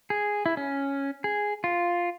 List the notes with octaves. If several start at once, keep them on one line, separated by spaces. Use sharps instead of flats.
G#4
E4
C#4
G#4
F4